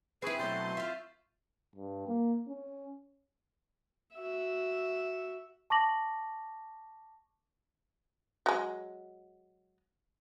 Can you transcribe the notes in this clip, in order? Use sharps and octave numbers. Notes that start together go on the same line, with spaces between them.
C4 E4 G#4 B4 C#6 E6 C7
B2 F#3 A3 C6 G6 A6
F4 E5 F5
G2
A#3
C#4
F#4 E5
A5 C#6 D6 A#6 F#7
F#3 G#3